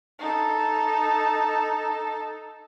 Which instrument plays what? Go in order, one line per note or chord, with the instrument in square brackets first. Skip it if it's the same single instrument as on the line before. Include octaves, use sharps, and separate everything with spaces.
[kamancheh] D#4 A4